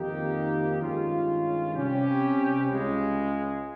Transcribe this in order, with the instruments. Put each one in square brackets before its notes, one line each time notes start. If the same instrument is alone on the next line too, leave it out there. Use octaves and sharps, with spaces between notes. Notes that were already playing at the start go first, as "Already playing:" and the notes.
Already playing: [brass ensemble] F2 D#3 A#3 D#4 G4
G2 D#3 G#3 C#4 F4
C3 G3 C#4 G4
C#2 C#3 G#3